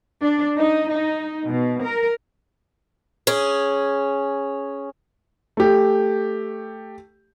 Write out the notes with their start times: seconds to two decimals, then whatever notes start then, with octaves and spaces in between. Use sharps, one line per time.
0.22 D4
0.57 D#4
0.93 D#4
1.47 B2
1.84 A#4
3.27 C#4 G#4
5.57 A3 G4